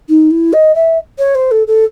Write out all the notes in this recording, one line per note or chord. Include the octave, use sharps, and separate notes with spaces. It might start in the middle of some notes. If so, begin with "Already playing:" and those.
D#4
E4
D#5
E5
C#5
C5
A4
A4